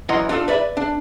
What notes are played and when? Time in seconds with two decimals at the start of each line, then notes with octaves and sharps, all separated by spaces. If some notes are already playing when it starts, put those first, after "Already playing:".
0.09 F#2 E3 D#5 F#5 A#5 C6
0.29 D4 F4 G4 A4
0.48 B4 D5 E5 B5
0.77 D4